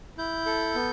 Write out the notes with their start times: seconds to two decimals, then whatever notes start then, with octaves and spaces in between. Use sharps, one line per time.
0.18 E4 G6
0.46 A4
0.75 B3